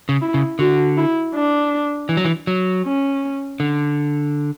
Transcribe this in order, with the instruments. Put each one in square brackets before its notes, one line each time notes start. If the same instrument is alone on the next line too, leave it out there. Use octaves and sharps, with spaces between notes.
[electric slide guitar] C#3
[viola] E4
[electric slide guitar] C#3
[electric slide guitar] D3 [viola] F#4
[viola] E4
D4
[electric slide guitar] E3
F#3
E3
F#3
[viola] C#4
[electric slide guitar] D3